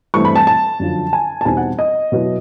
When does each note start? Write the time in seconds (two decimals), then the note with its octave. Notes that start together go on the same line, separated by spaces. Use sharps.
0.14 G2 E3 A3 C4 C#6
0.25 B5
0.36 A5
0.47 A5
0.80 F#2 D3 F3
1.13 G#5
1.41 A5
1.45 E2 B2 G3 C4 D#4 G#5
1.57 F#5
1.79 D#5
2.12 B2 F#3 B3 E4